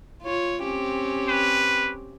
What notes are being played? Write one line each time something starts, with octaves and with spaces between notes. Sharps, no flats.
F4 C#5
C4 C#4 G4
B4